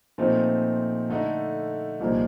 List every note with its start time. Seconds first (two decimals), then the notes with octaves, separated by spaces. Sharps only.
0.18 A#2 F3 A3 C4 D#4
1.09 D3 A3 D#4
2.00 C2 A#2 F3 A#3 D#4